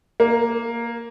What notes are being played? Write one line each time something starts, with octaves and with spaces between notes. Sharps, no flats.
A#3